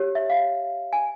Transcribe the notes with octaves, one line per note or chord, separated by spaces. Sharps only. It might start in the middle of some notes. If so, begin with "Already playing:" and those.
Already playing: G4 C#5
E5
F5
G#5